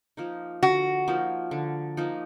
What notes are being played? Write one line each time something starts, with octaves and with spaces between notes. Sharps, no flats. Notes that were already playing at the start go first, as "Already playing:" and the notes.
F3 A#3 D#4
D3 F#4
F3 A#3 D#4
D3
F3 A#3 D#4